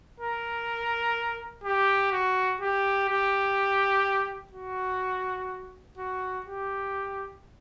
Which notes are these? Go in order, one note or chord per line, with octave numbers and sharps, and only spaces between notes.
A#4
G4
F#4
G4
G4
F#4
F#4
G4